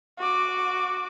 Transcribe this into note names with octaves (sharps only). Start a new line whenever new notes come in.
F#4 D6